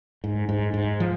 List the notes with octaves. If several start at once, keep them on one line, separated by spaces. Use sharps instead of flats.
G#2
G#2
G#2
F3